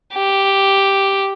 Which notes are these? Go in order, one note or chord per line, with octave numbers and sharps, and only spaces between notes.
G4